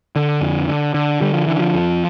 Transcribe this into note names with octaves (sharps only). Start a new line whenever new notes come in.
D3
F2
D3
D3
D3 G3
F3
D3 E3
F3
F2